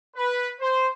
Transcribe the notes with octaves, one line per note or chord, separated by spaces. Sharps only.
B4
C5